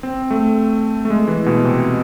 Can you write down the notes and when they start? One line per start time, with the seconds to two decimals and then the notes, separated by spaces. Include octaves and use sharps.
0.03 C4
0.31 A3
1.05 A3
1.10 G#3
1.28 E3
1.46 B2
1.64 C3